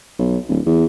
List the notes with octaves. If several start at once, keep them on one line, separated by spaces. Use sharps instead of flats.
B1
D1
E2